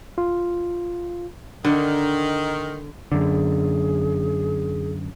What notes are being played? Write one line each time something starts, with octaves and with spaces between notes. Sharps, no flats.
F4
D3 D#3
F#2 D3 G#4